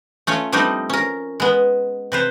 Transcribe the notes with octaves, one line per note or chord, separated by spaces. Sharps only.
A3 C#4 F4 C#5
F3 G3 A3 C4 D4 D#4
C#4 A#4
G#3 B3
C3 B4 C5